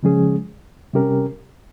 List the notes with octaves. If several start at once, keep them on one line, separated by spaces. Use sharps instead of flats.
C#3 F3 G#3 C#4 G#4
C3 G3 C#4 G4 A#4